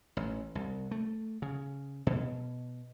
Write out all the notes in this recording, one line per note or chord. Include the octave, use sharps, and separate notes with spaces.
A1
C2
A3
C#3
B2